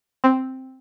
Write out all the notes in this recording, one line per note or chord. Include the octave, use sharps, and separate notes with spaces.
C4